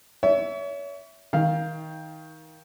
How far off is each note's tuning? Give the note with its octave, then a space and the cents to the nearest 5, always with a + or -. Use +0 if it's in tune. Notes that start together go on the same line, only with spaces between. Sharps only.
C#5 +35 E5 +0
D#3 +25 F5 +0